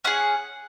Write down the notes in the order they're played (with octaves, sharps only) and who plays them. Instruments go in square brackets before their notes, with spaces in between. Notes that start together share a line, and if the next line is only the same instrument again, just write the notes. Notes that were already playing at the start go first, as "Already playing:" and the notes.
[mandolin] C#4 G#4 F#5